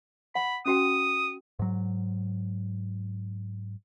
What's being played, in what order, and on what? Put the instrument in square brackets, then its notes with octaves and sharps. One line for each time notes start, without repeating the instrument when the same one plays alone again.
[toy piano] F#5 [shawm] B5
[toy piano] C#4 F#4 G5 [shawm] D#6
[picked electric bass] G#2 F#3